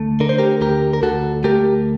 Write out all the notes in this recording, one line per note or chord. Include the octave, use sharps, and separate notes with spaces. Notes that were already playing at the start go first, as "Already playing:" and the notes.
Already playing: D2 A3
D3 A#4
C5
G4 A#4
D2 G4 A#4
A#4
D2 F#4 A4
A3 G4 A#4